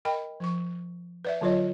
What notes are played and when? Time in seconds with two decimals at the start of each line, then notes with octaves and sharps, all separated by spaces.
0.05 A#4 D#5 G5 B5
0.40 F3 C#6
1.25 B4 D5 E5
1.41 D3 F#3 F4 C#5 D#5